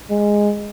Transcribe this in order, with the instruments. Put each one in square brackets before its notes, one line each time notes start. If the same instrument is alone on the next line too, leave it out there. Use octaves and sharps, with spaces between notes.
[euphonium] G#3